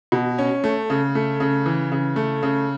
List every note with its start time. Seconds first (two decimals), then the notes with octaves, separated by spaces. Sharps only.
0.12 B2
0.38 C#4
0.64 A3
0.90 C#3
1.15 A3
1.40 C#3
1.66 E3
1.92 C#3
2.16 A3
2.43 C#3